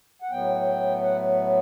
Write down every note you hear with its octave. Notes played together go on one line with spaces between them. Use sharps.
F#5
A2 F#3 B3 G5
F#5